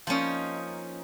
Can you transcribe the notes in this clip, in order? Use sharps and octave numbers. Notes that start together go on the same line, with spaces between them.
F3 A#3 C#4 D#4